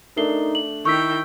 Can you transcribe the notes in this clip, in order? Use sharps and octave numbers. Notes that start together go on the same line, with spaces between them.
A3 D4 D#4 A#4 C7 G7
F#7
D#3 E4 G5 C#6 E6 B6